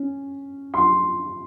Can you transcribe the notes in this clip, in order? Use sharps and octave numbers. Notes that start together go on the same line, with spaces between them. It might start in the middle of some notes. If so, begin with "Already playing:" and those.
Already playing: C#4
C6